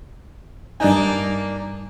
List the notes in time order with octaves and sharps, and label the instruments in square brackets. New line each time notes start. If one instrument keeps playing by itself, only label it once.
[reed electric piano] G2 G#5 [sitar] A#3 D4 D#4